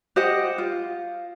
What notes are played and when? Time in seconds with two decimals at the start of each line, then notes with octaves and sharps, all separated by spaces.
0.16 G4 C5 D#5 F#5
0.58 F4